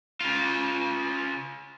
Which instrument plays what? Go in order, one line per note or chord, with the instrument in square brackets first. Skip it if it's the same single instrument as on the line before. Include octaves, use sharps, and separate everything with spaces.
[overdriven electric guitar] C#3 F4